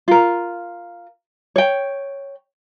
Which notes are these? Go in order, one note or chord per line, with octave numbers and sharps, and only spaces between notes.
F4 A#4
C#5 G5